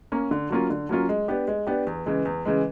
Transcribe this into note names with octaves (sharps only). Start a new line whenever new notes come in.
A#3 C#4
D3
F#3 A#3 C#4 F4
D3
F#3 A#3 C#4 F4
G#3
B3 D4 G4
G#3
B3 D4 G4
E2
C#3 E3 G#3
E2
C#3 E3 G#3